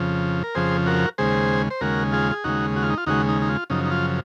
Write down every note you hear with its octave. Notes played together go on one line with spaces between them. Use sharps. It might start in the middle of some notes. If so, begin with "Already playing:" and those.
Already playing: F2 C#3 F3
A#4
F2 C#3 F3 G#4 C5
F#4 A#4
D#2 C#3 G#3 G#4 C5
C5
D#2 C#3 G#3 F#4 A#4
F4 G#4
G#4
D#2 C#3 G#3 D#4 F#4
F#4
F4
D#4
F4
D#2 C#3 G#3 D#4 F#4
D#4
D#4
F4
F#2 C#3 F3 D#4
D#4
F4